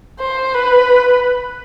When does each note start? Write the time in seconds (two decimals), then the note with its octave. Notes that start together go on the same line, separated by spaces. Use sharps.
0.20 C5
0.54 B4